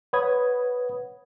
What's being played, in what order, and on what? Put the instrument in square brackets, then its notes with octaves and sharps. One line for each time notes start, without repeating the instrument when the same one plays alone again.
[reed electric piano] B4 C#5 F#5 B5 D#6 G#6